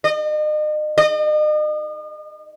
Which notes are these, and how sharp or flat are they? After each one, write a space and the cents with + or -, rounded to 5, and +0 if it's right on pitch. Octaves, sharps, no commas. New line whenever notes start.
D#5 -40
D#5 -40